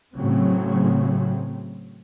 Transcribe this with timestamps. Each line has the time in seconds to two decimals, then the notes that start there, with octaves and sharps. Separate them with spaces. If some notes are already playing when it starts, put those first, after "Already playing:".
0.15 A2 C#3 F#3 C4